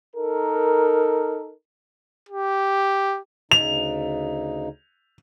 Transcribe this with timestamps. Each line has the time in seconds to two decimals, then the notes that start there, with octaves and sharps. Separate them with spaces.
0.16 D#4 A4 A#4
2.29 G4
3.51 D2 C#3 D#4 F7